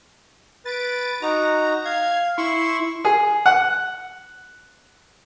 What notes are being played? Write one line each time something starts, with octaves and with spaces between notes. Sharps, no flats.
B4 A6 D7
D#4 F#4 A#5
F5 G#6
E4 C6 C#6
G#4
F#5